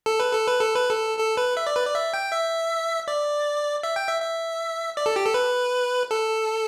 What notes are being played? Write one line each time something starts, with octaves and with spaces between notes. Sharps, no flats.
A4
B4
A4
B4
A4
B4
A4
A4
B4
E5
D5
B4
D5
E5
G5
E5
D5
E5
G5
E5
E5
D5
A4
G4
A4
B4
A4